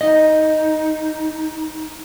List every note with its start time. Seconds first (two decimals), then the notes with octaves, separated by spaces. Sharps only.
0.01 D#4 D#5